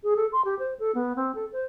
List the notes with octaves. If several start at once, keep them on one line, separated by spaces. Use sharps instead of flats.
G#4
A4
C6
G4
C5
A4
B3
C4
A4
C5